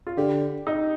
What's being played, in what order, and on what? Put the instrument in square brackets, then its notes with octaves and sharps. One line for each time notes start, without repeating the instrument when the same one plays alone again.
[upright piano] F4
[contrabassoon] D3 [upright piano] G4
[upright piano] D#4